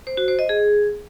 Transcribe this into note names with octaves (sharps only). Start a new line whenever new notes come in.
C5
F#4
C5
D#5
G#4